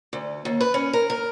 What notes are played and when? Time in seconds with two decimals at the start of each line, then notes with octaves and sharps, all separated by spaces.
0.13 D2
0.45 D#2
0.61 B4
0.74 C#4
0.93 A#4
1.10 A#4